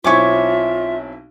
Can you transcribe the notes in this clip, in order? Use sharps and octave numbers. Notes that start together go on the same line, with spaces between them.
B1 C4 E4 F4 C#5 E5 G#5 D6